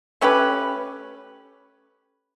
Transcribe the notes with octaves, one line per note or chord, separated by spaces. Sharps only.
A3 C#4 G4 B4